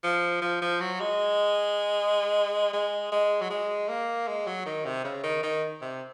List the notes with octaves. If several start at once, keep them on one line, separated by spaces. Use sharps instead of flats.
F3
F3
F3
F#3
G#3
G#3
G#3
F#3
G#3
A#3
G#3
F#3
D#3
C3
C#3
D#3
D#3
C3